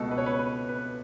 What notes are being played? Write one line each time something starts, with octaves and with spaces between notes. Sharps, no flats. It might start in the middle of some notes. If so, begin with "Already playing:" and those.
Already playing: C#2 B2 A3 A4
B4
C#5
B4
B4
B4